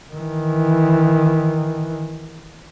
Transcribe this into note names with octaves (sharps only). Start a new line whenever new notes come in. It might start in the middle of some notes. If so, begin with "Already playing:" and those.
D#3 E3